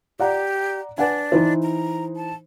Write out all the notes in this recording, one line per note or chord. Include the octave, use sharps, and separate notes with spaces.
G4 D5 F#5 A#5
D4 B4 F#5 G#5
E3 D#4 C5
A#5
A5